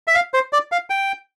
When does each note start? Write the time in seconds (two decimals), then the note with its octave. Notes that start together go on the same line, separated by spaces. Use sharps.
0.07 E5
0.15 F5
0.34 C5
0.53 D5
0.72 F5
0.90 G5